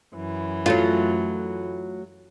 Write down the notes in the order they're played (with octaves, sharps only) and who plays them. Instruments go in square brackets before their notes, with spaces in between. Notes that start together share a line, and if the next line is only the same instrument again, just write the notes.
[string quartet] F#2 E3
[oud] F#3 A3 F4